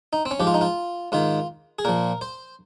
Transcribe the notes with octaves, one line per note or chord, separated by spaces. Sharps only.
D#4
C4
C#4
G#2 F3 G4
F4
D#4
F4
G#2 D#3 F4
G#4
A#2 F3 A#4
C5